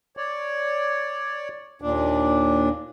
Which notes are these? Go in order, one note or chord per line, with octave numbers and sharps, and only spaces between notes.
C#5 D5
D#2 A#2 D4